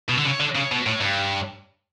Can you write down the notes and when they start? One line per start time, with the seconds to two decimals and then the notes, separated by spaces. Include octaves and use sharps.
0.09 B2
0.18 D3
0.25 C#3
0.40 D3
0.55 C#3
0.71 B2
0.86 A2
1.01 G2